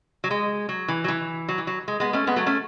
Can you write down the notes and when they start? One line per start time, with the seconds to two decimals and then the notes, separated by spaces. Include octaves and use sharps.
0.24 F#3
0.31 G#3
0.69 F#3
0.88 E3
1.04 F#3
1.08 E3
1.49 F#3
1.58 E3
1.67 F#3
1.88 G#3
2.00 G#3 B3
2.13 A3 C#4
2.27 G#3 B3
2.36 F#3 A3
2.46 A3 C#4